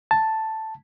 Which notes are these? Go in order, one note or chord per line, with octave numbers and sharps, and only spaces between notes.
A5